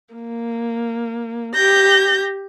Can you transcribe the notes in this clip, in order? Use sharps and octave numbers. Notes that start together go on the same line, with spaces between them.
A#3
G4 G6 A#6